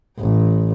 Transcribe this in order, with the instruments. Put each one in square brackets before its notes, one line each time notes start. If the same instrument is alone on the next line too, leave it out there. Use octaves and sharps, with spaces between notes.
[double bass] A1